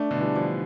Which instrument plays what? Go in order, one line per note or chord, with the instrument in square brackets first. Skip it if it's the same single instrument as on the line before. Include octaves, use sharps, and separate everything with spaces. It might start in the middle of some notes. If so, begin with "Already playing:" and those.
Already playing: [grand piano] A3 [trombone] D4
[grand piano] B2 D3
E3 G3
D3 F3